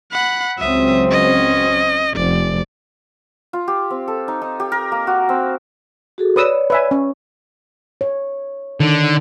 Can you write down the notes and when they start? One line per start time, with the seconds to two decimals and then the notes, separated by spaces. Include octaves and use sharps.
0.12 F#5 B5
0.58 C#2 F#3 C4 E5 D#6
1.10 C#4 D#5
2.16 F1 D5
3.53 F4
3.68 G4
3.90 C4
4.08 A4
4.28 D#4
4.42 D#4
4.60 G4
4.72 A#4
4.92 A#3
5.07 F#4
5.29 C4
6.18 F#4 G#4 A4
6.36 B4 C#5 D5 D#6 E6
6.70 B4 E5 G#5
6.91 C#4
8.01 C#5
8.80 D3 D#3